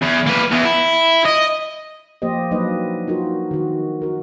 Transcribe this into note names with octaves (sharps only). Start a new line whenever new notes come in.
E2
A#3 B4
E2
E4
D#5
F3 A#3 G4 C5 D#5
F#3 A#3 D4 D#4 B4 D#5
D#4 F4 F#4 A#4
D#3 F#4
F#4 A#4